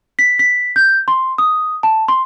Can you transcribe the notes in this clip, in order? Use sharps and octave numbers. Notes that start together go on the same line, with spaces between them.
B6
B6
G6
C6
D#6
A5
C6